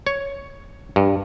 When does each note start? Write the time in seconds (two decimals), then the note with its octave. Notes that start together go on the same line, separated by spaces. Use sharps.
0.07 C#5
0.96 G2